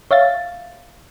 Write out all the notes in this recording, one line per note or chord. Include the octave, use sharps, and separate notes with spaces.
C#5 E5 F5 A6